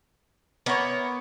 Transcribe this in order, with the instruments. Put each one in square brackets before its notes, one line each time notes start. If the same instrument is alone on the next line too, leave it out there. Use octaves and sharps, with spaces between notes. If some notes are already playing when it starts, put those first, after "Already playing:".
[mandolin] A#3 E4 C#5 [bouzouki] B3